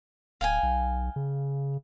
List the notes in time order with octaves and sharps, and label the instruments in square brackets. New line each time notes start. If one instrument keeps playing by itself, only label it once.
[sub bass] D1 [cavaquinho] F5 G5 G#5
[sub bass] B1
C#3